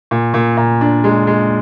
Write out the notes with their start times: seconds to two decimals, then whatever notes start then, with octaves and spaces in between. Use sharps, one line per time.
0.11 A#2
0.34 A#2
0.57 A#2
0.81 D4
1.04 G#3
1.27 G#3